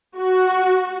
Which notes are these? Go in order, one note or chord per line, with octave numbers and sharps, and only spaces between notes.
F#4